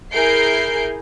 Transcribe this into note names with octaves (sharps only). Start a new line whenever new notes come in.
E4 G#4 A#4 G6 C7 D7